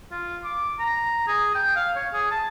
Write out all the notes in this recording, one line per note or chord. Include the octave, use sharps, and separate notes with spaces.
F4
D6
A#5
G#4
G5
F5
C#5
G#4
A5